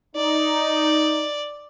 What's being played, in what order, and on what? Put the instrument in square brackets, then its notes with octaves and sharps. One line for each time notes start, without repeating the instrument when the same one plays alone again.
[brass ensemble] D#4 [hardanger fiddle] D5